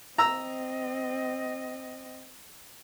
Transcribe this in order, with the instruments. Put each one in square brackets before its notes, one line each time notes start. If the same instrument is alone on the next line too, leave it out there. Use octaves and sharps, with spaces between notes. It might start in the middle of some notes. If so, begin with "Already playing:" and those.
[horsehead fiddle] C4 D#5 [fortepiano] A#5 E6